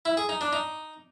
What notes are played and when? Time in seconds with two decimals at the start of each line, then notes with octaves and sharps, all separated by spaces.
0.05 E4
0.17 G#4
0.29 D#4
0.41 D4
0.53 D#4